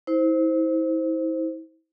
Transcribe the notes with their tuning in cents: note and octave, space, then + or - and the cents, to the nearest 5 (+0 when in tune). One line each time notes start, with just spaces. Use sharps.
E4 -40 C5 +0